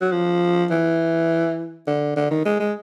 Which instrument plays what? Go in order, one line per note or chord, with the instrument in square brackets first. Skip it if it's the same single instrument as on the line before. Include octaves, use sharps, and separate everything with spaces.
[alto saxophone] F#3
F3
E3
D3
D3
D#3
G#3
G#3